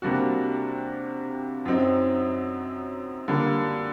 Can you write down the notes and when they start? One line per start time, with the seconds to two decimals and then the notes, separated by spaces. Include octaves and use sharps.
0.02 C3 G3 A#3 D4 F#4
1.66 F#2 F#3 C4 D#4
3.28 D3 G3 A#3